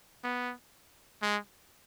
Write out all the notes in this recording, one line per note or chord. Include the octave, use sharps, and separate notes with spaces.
B3
G#3